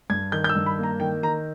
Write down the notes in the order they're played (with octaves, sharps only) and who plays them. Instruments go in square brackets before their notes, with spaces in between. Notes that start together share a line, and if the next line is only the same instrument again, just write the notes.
[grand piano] G2 G#6
D#3 G6
G6
E6
G2
B5
A#3
A#5
D#3 G5
D#3 A#5